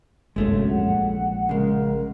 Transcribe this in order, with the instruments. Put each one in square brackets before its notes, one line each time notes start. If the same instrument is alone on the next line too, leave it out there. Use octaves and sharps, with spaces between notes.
[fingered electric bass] G1 C2 F#2 [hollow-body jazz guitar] G#3 A3 C#4
[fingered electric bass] A#1 [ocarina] F#5
[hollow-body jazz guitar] C#3 G#3 [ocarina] A#4